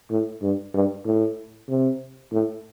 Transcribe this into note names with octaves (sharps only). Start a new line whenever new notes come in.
A2
G2
G2
A2
C3
A2